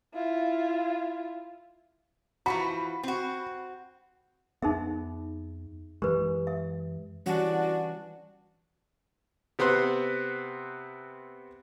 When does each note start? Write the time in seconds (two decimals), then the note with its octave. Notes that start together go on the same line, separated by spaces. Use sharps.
0.14 E4 F4
2.46 E3 F3 F#4 B5
3.03 C4 F#4
4.62 F2 B3 D#4 G#4 E5
6.02 F#2 E3 G#3 G4 B4
6.47 E5
7.26 E3 G3 C#4 D4 F#4
9.59 C3 B3 C4 F#5 C6